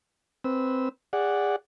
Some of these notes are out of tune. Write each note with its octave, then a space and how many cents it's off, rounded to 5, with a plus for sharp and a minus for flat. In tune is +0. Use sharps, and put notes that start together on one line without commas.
C4 +0 B4 +0 E6 -20
G#4 -30 D5 -10 F#5 -5